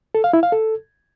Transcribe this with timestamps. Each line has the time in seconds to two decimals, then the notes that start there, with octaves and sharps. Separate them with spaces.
0.15 A4
0.24 F5
0.33 E4
0.43 F5
0.52 A4